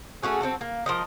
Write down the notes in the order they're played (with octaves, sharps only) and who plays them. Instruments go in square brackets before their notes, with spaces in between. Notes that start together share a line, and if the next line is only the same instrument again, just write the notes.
[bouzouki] A3 C#4 F#4 G#4
C4 D4 F#4 A4
A#3
F3 A#4 D#5